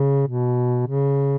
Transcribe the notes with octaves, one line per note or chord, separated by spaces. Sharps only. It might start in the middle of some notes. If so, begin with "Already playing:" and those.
Already playing: C#3
B2
C#3